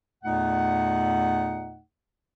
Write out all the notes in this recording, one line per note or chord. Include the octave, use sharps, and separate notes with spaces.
E2 A#2 A3 D#4 F#5